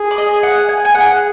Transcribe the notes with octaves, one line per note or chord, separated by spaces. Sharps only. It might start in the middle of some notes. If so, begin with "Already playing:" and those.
Already playing: G#4
D5
D#5
F#5
G#5
G#5
G#4 F#5